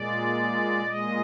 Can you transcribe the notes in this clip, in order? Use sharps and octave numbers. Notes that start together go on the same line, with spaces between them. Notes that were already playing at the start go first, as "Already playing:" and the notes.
Already playing: A#2 G#3 D5
A#2 G#3 D#5